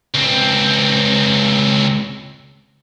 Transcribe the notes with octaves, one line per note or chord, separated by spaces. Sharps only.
C#2 C4